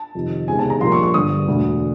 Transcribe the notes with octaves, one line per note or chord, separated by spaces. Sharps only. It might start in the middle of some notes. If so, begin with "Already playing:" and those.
Already playing: A5
F2 C3 D#3
C#2 C3 D#3 G#3 B3 G#5
A5
A#5
A#1 A#2 G3 A#3 C6
C#6
C#6
G1 G2 D3 D#6
E1 D2 D3